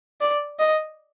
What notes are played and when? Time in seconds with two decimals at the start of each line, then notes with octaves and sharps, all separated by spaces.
0.21 D5
0.59 D#5